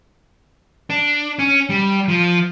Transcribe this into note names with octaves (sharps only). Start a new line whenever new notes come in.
D4
C#4
G3
F3